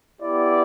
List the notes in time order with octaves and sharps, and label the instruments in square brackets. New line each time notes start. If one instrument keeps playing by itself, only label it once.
[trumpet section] B3 E4 G4 D5